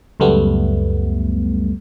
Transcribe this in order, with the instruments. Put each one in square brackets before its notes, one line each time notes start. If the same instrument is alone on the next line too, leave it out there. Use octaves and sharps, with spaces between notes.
[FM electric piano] C#2 F#2 G3 A3 B3